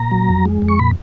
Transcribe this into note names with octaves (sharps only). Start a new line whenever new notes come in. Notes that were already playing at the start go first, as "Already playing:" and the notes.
Already playing: A#2 A#5
F#3
F2
G#3
F2
C#6
A#2 B5